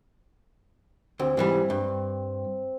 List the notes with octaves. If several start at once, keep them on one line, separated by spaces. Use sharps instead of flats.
D2 C4
G#2 E3 G3
G2